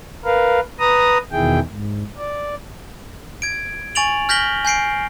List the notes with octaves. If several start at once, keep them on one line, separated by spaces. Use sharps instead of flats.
A#4 B4 F5
B4 A#5 D#6
E2 B2 D#3 E4 G#4 G5
G#2
D5
G#6 D7
G#5 C#6 A6 D7 F7 F#7
F6 G6 A#6 B6 F#7 G7
G#5 G6 C7 D7